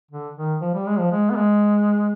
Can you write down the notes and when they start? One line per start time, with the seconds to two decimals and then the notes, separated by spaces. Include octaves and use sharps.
0.11 D3
0.37 D#3
0.61 F3
0.74 G3
0.86 G#3
0.98 F3
1.12 G#3
1.30 B3
1.36 G#3